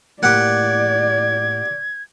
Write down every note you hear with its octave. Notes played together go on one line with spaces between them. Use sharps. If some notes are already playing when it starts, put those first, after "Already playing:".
A2 A#3 G4 D5 F#5 G#6